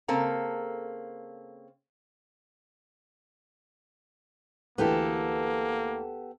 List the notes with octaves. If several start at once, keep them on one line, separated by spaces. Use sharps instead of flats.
C#3 A#3 C4 A4 A#5
D2 E3 A#3 B3 G4 A4